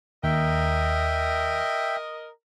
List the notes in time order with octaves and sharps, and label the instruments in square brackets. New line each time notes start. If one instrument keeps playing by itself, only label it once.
[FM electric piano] D#2 [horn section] A#4 D#5 [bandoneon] E5 G5